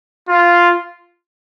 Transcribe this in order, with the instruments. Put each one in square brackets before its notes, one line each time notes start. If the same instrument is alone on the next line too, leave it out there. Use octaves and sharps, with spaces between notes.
[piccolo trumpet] F4